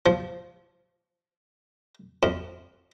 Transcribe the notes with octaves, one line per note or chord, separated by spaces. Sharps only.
F3
F2